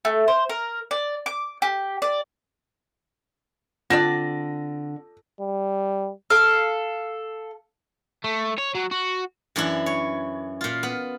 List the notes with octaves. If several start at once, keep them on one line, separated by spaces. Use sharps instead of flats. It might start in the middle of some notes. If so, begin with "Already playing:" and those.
A3
C5
A#4
D5
D6
G4
D5
D3 C4 D4 F4 D5 F#5 F6 A#6
G3
A4 F5
A3
C#5
F#3
F#4
F#2 E3 D4 E4
C#5
A#2 F4
B3